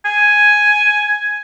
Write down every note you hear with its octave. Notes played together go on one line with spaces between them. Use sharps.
G#5